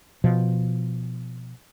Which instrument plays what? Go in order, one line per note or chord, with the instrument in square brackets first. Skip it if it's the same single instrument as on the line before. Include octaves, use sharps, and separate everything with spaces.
[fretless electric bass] B2 F3